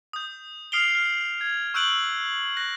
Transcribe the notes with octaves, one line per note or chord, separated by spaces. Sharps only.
D#6 G6
D#6 F6 C7 D7 F7 G7
F6
G#6
C#6 E6 F#6 G6 D7 F#7
F#6 A#6